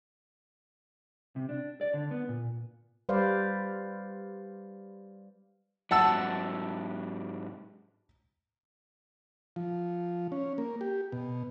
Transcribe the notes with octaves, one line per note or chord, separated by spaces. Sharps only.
C3
D4
D5
D3
B3
A#2
G3 B4 C5 D5 F5
G#2 F#3 F#5 A5 E6
F3
C#4
A#3
G4
B2